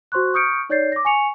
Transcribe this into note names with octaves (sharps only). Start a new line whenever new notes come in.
F#4 C5 C6 C#6 F#6
C#6 D#6 F6 G6 C#7 D7
D#4 C#5 D5 G6 A6 C7
D6 A#6
G#5 C#6 C#7 F7